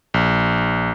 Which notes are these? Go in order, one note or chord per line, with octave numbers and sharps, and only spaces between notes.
A#1